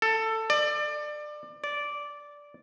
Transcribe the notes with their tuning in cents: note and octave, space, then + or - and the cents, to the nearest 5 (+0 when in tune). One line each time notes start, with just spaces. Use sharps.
A4 +15
D5 +25
D5 -10